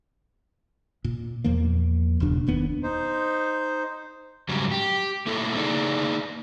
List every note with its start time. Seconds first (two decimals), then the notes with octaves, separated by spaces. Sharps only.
1.04 A#2
1.44 E2 A#2 F3 A#3
2.20 E1 C#2 B2 D4
2.47 F1 D#2 B3 D4
2.83 D#4 C5
4.49 G#2 C#3 F#3 G3
4.72 G4
5.27 A3 A#3 E4 A4
5.55 A#3 D#4 G#4 D5